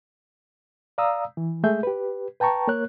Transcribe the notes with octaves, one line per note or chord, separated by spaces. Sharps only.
D5 F5 A#5 D#6 E6
E3
G#3 A3 G#4 E5 G6
G4 B4
B4 G5 A5 A#5 C#6
A#3 A#4 C#5 F#6